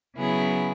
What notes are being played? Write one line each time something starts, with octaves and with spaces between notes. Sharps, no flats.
C#3 F#3 B3 E4 G#4